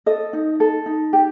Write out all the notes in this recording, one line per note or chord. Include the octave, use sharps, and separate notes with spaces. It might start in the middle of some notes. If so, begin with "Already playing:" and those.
A4 D#5
D#4
A4
D#4
G4